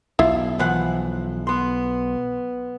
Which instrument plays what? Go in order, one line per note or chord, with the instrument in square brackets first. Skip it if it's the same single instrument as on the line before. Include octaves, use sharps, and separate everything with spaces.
[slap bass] B1 [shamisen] E4 F4
[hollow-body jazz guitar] E3 F3 F#5
B3 C6